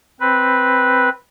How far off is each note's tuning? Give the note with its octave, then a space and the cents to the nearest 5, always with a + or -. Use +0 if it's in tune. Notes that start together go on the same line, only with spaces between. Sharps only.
C4 +0 B4 +0